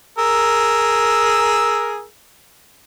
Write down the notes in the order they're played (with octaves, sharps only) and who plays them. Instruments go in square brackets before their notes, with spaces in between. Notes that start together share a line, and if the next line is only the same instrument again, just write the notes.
[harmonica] G#4 A#4 E6